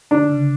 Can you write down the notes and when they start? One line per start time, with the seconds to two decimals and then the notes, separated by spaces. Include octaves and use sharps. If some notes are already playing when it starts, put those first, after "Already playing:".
0.11 D3 D4
0.29 C#3